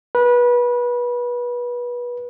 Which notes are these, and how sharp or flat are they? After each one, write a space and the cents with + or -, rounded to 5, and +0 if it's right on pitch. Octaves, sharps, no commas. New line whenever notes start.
B4 -25